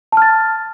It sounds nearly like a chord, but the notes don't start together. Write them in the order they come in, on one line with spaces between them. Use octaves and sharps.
A5 F6 A6